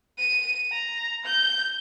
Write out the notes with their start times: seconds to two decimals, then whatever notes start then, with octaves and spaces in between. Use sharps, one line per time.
0.18 D#7
0.72 A#5
1.25 G6